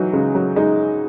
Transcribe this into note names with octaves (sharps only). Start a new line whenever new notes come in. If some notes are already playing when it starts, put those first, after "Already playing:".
Already playing: E3 F#3 D#4
C#3 G#3
F#3
G#3 D#4